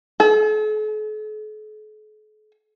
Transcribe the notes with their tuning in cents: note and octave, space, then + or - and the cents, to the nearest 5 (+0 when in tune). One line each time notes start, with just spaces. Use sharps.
A4 -45